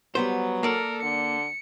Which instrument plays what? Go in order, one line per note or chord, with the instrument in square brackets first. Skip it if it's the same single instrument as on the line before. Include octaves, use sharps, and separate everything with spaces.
[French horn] F#3 [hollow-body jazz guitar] G3 B3 C5
[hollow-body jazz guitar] A#3 D5 [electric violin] A4 A#4
[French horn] D3 [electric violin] C#7